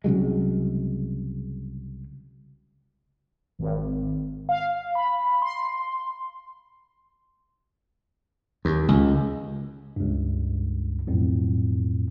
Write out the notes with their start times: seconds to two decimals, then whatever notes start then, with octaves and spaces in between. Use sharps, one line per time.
0.04 C2 C#3 F#3 G#3
3.59 G#1
4.49 F5
4.95 B5
5.42 C6
8.65 D#2
8.88 C#2
9.96 C#2 G2
11.07 B1 F2 A2